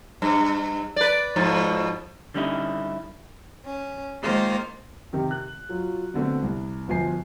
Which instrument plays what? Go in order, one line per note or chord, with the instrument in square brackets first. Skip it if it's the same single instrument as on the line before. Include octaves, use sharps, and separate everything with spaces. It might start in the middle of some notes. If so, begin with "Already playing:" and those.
[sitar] G2
B4 D5
G#2 B2 F3
[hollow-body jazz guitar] D3 G3 C#4 D#4 E4
[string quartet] C#4
D#3 G#3 A#3 F4 C5
[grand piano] C3 D#3
F#6
F#3 F4
B2 D3 A3 C4
C2
G1 B2 F3 G#5 C7